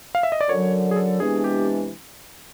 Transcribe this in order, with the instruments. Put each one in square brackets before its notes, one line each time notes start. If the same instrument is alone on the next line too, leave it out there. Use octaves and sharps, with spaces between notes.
[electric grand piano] F5
E5
D#5
D5
[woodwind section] F#2 D3 F#3 [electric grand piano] C#5
[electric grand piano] G#4
A4
[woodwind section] C3 E3 G#3 B3 D4 [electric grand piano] G#4
[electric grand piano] G4